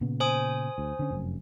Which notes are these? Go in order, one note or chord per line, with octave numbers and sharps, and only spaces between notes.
A#2 C#3 B3
C5 G#5 D#6
D2
D3 C#4
F1 F#2